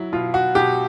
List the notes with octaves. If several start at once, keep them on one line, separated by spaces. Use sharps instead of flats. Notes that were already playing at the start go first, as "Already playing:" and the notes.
Already playing: F#3 E4
B2 F4
F#4
B2 G4